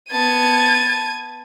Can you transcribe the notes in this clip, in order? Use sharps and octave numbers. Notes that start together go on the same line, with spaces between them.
B3 A5 G#6 D#7